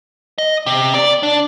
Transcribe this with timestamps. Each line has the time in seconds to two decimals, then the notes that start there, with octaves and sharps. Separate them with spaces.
0.38 D#5
0.66 C3
0.94 D5
1.23 D4